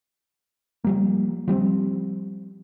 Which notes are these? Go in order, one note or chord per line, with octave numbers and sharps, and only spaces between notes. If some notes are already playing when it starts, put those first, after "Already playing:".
F3 G3 A#3
F3 G3 B3 C4